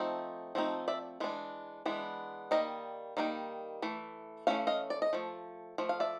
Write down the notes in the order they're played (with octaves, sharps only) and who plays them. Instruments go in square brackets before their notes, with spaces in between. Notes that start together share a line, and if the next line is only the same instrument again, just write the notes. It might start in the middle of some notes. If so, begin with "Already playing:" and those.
Already playing: [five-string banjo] F3 A3 C4 D#4
F3 A3 C4 D#4
D5 E5
E3 G#3 D4
E3 G#3 B3 D4
D#3 G3 A#3 D#5
D#3 G3 A#3 D#4
E3 A3
E3 A3 C#4 F5
D#5 F5
D5
D#5
F3 A3
F3 A3
F5
D5 E5